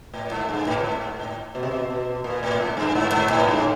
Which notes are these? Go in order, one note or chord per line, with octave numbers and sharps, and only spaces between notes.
A2
G#2
G2
A2
A2
G#2
G#2
A2
B2
C3
B2
B2
A#2
A2
G#2
G2
G#2
G#2
A2
G2
A2